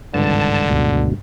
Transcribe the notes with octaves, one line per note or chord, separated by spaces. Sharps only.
G#1 C#2 G2 D3 A5
D2 B2